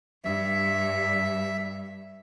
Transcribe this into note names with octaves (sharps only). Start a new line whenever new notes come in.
G2 E5